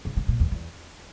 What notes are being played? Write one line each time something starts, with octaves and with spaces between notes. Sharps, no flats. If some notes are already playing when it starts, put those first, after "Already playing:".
C#3
C#3
A#2
E2
E2